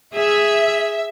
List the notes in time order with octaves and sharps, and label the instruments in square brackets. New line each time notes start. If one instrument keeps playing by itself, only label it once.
[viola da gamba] G#4 [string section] E5